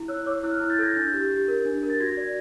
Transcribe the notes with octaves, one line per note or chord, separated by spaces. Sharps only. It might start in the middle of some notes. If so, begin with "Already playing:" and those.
Already playing: E4
C#5 E6 F#6
C#5 D6 E6
E4 E6 F#6
F6
E6 F#6
E4
G6 A6
A4 G#6 A#6
D4 G6 A6
G4
G4
A#4
D4
A#4
A6
F#4 G#6 A#6
D5